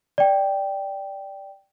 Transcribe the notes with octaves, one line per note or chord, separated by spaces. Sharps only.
D5 G5